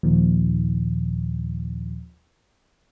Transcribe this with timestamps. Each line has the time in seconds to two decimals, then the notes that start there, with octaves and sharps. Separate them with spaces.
0.03 D#2 A#2 D#3 F3